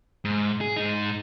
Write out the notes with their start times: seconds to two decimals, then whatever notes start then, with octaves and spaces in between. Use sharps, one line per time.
0.25 G#2
0.61 G#4
0.76 G#2 D#4